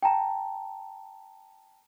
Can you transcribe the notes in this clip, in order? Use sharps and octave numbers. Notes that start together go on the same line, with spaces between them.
G5 A5 A#5